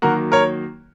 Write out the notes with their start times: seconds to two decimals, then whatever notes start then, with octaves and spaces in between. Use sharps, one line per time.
0.02 D#3 F#3 A#3 F#4 A#4
0.32 A#4 C#5